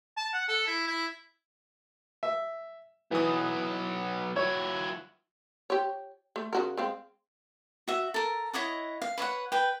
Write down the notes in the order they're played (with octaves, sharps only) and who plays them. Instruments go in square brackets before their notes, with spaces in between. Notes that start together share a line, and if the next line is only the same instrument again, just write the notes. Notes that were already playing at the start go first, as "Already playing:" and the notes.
[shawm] A5
F#5
A4
E4
E4
[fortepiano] E5
[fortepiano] E3 D#6 [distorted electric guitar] F#3 B3
[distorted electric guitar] F#3 E4 [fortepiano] C#5
[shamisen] G4 C#5
A3
C#3 F#4 A#4
G#3 C4 F5
[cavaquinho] F#4 E5
A4 A#4
E4 C#5 D#5 F#5
F5
B4 C#5 E5 F#5
B4 G5